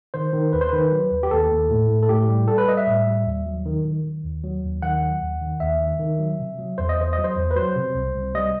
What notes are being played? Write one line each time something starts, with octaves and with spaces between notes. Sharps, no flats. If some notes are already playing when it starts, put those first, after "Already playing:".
D#3 C5
D#3
D#2 B4
C5
D#3 B4
F#3
D#2
G4
D#2 A4
D#2
A2
A2
A4
A2 G4
G3
G3 A4
B4
G3 D#5
E5
A2
G3
D#2
F#3
D#3
D#3
D#3
D#2
F#3
D#2
D#3 F#5
F#3
D#2
D#3
D#2 E5
D#3
D#3
F#3
C3
F#3
E2 C5
D#5
E2 C5
F#3 D#5
C5
E2
B4
F#3 C5
C3
C2
C2
G3 D#5